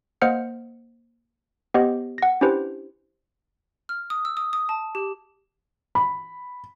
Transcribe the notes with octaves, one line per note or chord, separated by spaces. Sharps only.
A#3 C5 D#5 F#5 F6 C#7
B3 G4 C5 D#5
F#5 A#6
C#4 D4 E4 G4 B4 C5
F6
D#6
E6
D#6
D#6
A5
G4
B5